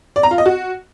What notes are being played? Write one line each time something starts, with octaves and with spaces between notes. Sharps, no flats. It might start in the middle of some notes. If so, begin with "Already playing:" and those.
D5
A#5
F4
D#5
F#4